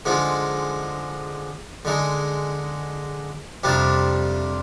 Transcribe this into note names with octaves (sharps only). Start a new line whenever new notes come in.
D3 F3 G#3 D#4
D3 G#3 D#4
F2 C3 G3 D4 F4